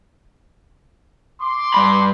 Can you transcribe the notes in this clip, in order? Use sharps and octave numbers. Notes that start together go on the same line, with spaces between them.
C6 D6
G2 B5